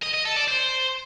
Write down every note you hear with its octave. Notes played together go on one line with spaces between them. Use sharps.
D#5
D#5
A4
D5
C5